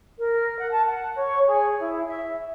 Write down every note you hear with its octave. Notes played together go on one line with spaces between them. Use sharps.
A#4
F#5
A5
F#5
C#5
G#4
E4
E5